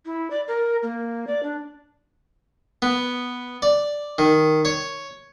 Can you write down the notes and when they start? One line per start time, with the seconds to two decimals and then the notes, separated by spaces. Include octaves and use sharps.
0.06 E4
0.31 D5
0.48 A#4
0.83 A#3
1.27 D5
1.43 D4
2.82 B3
3.62 D5
4.18 D#3
4.65 C#5